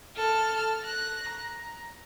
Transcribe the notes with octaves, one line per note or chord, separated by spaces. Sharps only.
A4 F6
F#6 A#6
A#5